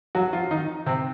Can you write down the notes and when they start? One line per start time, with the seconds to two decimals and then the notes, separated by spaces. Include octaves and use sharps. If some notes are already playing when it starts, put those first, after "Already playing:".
0.15 F#3 F#4
0.33 F3 F4
0.51 D#3 D#4
0.86 C3 C4